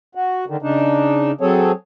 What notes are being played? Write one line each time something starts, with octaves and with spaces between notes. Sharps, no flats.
F#4
D3 D#3
C#3 D4 D#4
F#3 C4 G#4 A4 C#5